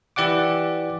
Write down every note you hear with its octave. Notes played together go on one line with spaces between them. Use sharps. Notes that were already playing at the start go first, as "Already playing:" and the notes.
E3 G4 D5 F#5 D6